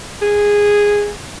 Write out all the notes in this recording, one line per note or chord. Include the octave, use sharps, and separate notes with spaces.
G#4